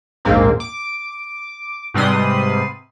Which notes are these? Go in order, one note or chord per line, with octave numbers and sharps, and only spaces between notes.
A#1 D#2 G#2 A#3 C4
D6
G#2 C3 G3 B4 C6 D#6